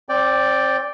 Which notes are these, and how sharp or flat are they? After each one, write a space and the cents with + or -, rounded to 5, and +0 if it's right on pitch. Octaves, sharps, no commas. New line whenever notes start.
C4 +35 D5 +0 G5 +0